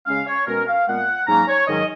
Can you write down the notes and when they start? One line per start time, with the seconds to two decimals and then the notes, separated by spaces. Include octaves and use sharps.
0.06 C#3 G#3 C#4 F5
0.27 C#5
0.47 B2 G#3 C#4 A#4
0.67 F5
0.87 A#2 G#3 B3 F#5
1.27 G#2 F#3 A#3 C#4 A#5
1.47 C#5
1.68 G#2 D#3 F#3 C#4 D#5